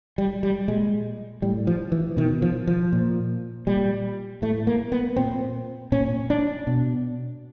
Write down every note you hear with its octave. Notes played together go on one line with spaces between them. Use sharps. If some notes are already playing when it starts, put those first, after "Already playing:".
G3
G3
A#2 G#3
A2 G3
F3
E3
B2 D#3
F3
F3
A#2
A#2 G3
A2 A3
A#3
B3
A#2 C4
A#2 C#4
D4
B2